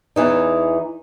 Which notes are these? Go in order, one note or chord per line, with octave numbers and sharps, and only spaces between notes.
E2 E3 D#4